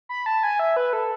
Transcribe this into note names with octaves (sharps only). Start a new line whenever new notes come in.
B5
A5
G#5
E5
B4
A4